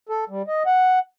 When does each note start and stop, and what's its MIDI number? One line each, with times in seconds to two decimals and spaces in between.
0.09 0.25 69
0.29 0.42 55
0.47 0.63 75
0.66 0.99 78